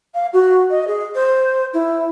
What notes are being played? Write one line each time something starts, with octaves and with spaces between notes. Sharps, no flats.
F5
F#4
D#5
G#4
C5
E4